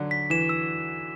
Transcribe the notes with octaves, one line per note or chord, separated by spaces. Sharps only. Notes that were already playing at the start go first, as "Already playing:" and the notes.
Already playing: D3 F#3
B6
E3 E7
E6